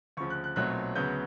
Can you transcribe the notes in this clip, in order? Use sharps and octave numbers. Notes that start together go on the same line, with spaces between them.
D2 C#3 F3 C#6
F#6
F#6
B1 A#2 F#3 A3 C4 F#6
D2 C#3 F#3 B3 G6